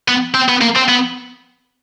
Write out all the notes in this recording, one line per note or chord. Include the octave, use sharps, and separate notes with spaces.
B3
C4
B3
A#3
C4
B3